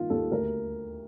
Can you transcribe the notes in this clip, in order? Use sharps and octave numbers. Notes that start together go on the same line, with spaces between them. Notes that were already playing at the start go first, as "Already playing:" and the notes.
Already playing: G2 D#3 A#3 F4
D#2 A4
D2 A#4